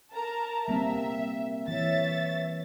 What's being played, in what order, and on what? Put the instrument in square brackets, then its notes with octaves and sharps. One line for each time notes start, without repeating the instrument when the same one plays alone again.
[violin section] A#4 A5 A#5
[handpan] G3 A#3 C4 [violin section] E5
[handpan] E3 [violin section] C#5 E5 A6